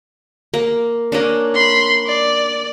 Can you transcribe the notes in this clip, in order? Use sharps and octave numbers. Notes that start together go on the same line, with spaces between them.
A#3
A#3 C#4 D4
B5 C6
D5